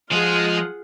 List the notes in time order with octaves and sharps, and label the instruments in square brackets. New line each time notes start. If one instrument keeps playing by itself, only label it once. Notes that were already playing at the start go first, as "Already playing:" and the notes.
[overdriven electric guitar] F3 [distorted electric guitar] G#3 D#5 [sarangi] F4 [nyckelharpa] G#4 F#5